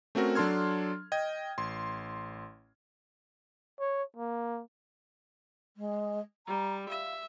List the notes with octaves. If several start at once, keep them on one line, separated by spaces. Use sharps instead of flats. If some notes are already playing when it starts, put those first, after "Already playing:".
A3 C4 C#4 F#4 A#4
F#3 D4 A4 C6 F6 G#6
D#5 G5 G#6
A1 C6
C#5
A#3
G#3
G3 A#5
E5 F5